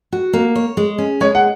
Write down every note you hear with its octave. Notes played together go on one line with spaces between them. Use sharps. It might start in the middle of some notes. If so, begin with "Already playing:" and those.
F#4
A#3
C#5
G#3
C#4
G#3 C#5
F#5